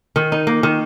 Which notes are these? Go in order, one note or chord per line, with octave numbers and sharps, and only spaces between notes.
D#3
D#4
A#3
D#3